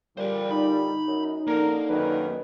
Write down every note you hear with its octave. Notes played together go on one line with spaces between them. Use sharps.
A#2 D3 G3 A#4 C5
D#4 B5
F#2
A#1 D3 A#3 C#4 A#4
F#2 D#3 B4